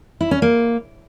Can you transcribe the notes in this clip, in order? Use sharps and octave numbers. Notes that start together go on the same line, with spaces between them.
E4
C#4
A#3